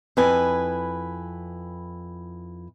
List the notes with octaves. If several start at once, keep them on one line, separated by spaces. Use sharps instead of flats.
F2 E4 B4 G#5